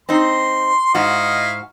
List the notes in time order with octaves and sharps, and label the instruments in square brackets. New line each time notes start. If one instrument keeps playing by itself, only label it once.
[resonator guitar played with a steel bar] C4 D#4 [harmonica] C6
[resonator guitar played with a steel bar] G#2 F#4 [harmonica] E4 D#5 F5